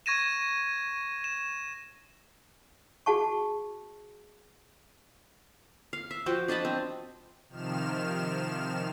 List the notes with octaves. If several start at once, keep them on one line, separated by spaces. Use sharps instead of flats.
C#6 G#6 A#6 D#7 E7
E7
F#4 G#4 F#5 A5 C#6
F5
E5
F3 F#4 C5 G5
D4 D#5 A5 B5
C4
C3 D#3 F3 F6 E7